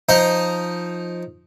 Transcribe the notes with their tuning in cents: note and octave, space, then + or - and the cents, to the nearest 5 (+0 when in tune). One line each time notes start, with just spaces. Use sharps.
F3 +5 D#4 +0 D#5 +0